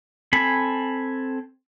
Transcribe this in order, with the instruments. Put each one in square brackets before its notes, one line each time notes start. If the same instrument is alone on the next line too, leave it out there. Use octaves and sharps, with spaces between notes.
[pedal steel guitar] C4 A4 G#5 B5